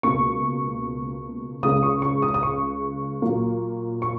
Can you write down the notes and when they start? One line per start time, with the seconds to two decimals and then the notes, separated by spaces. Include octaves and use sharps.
0.03 C#2 B2 A#3 C#6
1.63 C#2 C#3 G#3 D#6
1.83 C#6
2.02 C#6
2.22 D#6
2.34 D#6
2.43 C#6
3.22 A#2 F#3 A#3
4.02 C#6